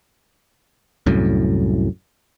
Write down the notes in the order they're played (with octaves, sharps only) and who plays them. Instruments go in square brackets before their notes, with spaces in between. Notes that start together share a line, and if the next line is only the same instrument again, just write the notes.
[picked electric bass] C2 F#2 A2